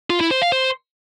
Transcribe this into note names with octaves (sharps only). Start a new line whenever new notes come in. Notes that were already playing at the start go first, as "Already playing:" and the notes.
F4
E4
C5
F5
C5